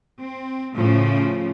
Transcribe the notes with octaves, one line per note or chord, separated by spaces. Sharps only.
C4
A2 C#3 F3